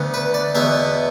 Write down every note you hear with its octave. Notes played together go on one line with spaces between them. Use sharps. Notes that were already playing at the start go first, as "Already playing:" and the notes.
Already playing: D2 D3 B3
B4
D5
E2 B2 B3 E5